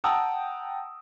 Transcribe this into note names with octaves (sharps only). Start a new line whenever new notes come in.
F#5 G5 A5 A#5 D#6 E6